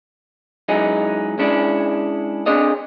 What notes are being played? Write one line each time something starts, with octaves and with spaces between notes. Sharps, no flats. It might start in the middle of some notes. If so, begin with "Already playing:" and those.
F#3 G#3 C#4 D#4 E4
G#3 C#4 D4 E4
C4 D4 G#4 C#5 D#5